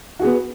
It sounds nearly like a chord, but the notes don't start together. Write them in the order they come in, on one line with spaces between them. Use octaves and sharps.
F#4 G#4 B3